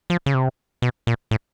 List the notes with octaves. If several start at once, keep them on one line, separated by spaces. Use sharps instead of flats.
F3
C#3
C3
B2
A#2
A2